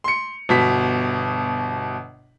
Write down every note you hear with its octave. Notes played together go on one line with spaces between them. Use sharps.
C6 C#7
G1 B2 B6